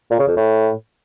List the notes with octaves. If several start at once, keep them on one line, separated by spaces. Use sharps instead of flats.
A#2
C#3
F2
A2